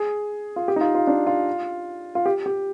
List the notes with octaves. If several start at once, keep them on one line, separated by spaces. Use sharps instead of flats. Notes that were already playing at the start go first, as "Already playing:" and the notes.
Already playing: G#4
F4
G4
D#4
F4
F4
D4
F4
F4
G4
G4